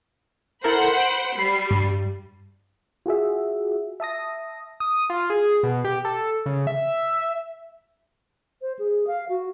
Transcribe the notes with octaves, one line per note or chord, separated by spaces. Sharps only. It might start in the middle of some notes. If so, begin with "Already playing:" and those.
E4 A4 A#4 C5 F#5 B5
D7
G3 B5 C7
G2
F4 F#4 G#4 E5
E5 A5 D#6 A#6
D#6
F4
G#4
B2
G4
A4
C#3
E5
C5
G#4
F5
F#4